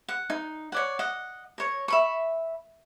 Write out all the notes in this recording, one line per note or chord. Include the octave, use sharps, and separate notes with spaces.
F#5
D#4
C#5 D5 F#5
D#5 F#5
A#4 C#5
E5 B5 C#6